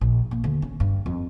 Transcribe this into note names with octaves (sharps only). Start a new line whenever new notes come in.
A#1
A#3
D2
C#4
G2
F2